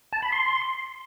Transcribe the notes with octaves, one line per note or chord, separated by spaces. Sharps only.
A5
B5
C6